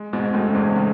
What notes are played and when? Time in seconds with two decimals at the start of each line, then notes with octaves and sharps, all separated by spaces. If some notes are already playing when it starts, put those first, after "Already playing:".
Already playing: G#3
0.13 G#2 B2
0.20 G#3
0.34 F#2 A2
0.48 C#3
0.54 E2 G#2
0.76 A2 C#3